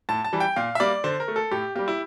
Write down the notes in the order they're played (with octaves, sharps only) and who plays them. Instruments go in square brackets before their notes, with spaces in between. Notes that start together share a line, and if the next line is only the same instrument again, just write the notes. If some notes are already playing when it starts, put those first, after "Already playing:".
[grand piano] A2 A5
A5
E3 G3
G5
A#2 F5
E5
G3 A#3 D5
D3 C5
A#4
A3
A4
A2 G4
G3 A#3 G4
E4